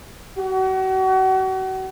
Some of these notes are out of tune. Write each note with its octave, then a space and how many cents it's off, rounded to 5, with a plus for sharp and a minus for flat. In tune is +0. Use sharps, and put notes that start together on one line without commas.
F#4 +35